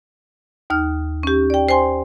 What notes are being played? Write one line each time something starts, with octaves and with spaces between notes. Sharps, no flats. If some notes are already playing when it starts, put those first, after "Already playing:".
D#2 D#4 F6
C#4 G4
D5 G5
C5 G5 G#5 C6